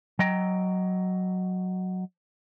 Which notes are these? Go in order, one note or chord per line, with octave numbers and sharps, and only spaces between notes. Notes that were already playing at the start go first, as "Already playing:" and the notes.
F#3 D#5 G5 A#5